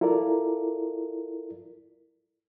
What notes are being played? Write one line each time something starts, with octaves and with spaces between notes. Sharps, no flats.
E4 F4 A4 A#4 D5